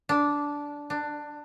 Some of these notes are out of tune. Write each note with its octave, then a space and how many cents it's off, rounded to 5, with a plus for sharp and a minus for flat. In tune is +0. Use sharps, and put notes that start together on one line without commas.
D4 -10
D4 +15